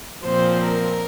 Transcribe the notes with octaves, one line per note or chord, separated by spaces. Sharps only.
A#2 F3 C4 C5
A#4